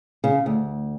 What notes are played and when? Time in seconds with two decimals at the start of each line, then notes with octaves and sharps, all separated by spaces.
0.24 C#3
0.46 D2